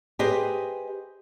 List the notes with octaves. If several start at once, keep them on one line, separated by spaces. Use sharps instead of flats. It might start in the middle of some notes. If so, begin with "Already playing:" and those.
G4 G#4 B4 C5 D#5